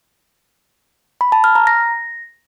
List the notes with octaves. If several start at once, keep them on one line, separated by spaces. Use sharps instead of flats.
B5
A5
F6
A#5
A#6